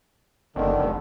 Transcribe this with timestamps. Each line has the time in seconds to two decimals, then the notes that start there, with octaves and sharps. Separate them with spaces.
0.56 F#1 D3 D#3
0.80 F1